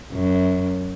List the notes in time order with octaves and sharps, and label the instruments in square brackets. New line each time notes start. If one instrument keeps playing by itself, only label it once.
[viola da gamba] F#2